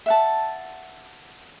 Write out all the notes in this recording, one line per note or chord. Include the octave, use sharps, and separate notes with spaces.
E5 F#5 A5